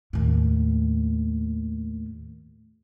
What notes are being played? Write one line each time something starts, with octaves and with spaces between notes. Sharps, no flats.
D#2 A2